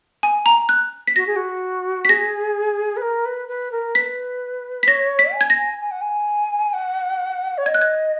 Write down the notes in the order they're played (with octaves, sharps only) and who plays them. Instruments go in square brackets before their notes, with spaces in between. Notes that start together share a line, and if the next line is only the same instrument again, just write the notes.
[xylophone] G#5
A#5
F#6
B6
[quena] F#4 [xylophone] A#6
[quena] G#4
F#4
[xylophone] B6
[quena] G#4 [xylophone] A#6
[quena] B4
A#4
B4
B4
A#4
[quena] B4 [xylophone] B6
[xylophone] B6
[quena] C#5 [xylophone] A#6
[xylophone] B6
[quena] G#5
[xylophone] G#6
A#6
[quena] G#5
F#5
G#5
F#5
C#5
[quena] D#5 [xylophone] G#6
[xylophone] F#6
G#6